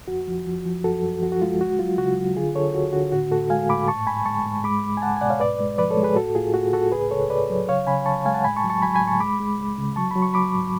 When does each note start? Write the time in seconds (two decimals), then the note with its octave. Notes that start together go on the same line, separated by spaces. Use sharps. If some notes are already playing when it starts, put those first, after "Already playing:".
0.08 F2 F#4
0.28 F3
0.46 F3
0.65 F3
0.84 F#2 F#4 A4
1.03 F#2
1.22 F3 F#4
1.32 F#4
1.42 G#3 F4
1.61 D2 F#4
1.79 F#3 F4
1.98 C#3 F#4
2.17 F#3
2.36 D3 F4 G#4
2.55 D3 A4 C#5
2.74 D2 F#4
2.93 D3 F#4
3.12 A2 F#4
3.31 A2 F#4 A4
3.50 G#3 F5 G#5
3.69 A2 B5 D6
3.88 G#2 A5 C#6
4.07 G#2 G#5 B5
4.26 G#3 A5 C#6
4.46 G#2
4.64 G#3 B5 D6
4.83 C#2
4.97 G#5
5.02 C#2 F#5 A5
5.17 G#5
5.21 B2 D5 F#5
5.30 C#5 F5
5.40 G#2 B4 D5
5.60 G#3
5.78 F3 B4 D5
5.90 A4 C#5
5.97 G#3
6.03 G#4 B4
6.16 A2 F#4 A4
6.35 A2 F4 G#4
6.54 A2 F#4
6.73 A2 F#4 A4
6.92 C#2 G#4 B4
7.11 C#2 A4 C#5
7.30 C#2 B4 D5
7.50 F#3
7.68 C#3 C#5 F5
7.87 C#3 G#5 B5
8.06 C#2 A5 C#6
8.25 G#3 F5 G#5
8.34 F#5 A5
8.44 A2 G#5 B5
8.56 A5 C#6
8.64 F#3
8.70 A5 C#6
8.82 F#3 G#5 B5
8.94 G#5 B5
9.01 A2
9.07 A5 C#6
9.20 G#3 B5 D6
9.40 G#3
9.58 C#2
9.78 C#3
9.96 F#3 A5 C#6
10.11 F#3 B5
10.22 C#6
10.34 F#3 B5 D6
10.54 G#2